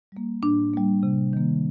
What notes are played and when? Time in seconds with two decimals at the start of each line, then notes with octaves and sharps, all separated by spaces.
0.12 G3 A#3
0.43 A2 D4
0.73 G3 A#3
1.03 C3
1.33 D#3 A#3